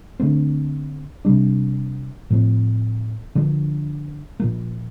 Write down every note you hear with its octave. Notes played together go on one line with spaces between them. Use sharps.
D3 A3 C4
C3 G3 D4
A2 F3 C4
D3 F3 A#3 D4
A#2 F3 A#3